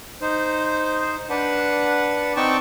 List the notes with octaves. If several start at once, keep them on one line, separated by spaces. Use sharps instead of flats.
D#4 C5
D4 B4 F#5
C4 D#4 D5 G5 A5 C#6